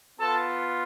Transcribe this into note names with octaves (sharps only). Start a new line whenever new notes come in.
B3 F4 A4 A5